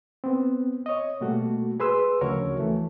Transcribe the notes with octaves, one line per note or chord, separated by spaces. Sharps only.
B3 C4
C#5 D#5
B2 G3 A3 A#3 F#4
G#4 B4 C6 E6
D2 C#3 F3 F#4 A#4 C#5
E3 A3